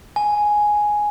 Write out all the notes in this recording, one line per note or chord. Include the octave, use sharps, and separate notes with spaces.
G#5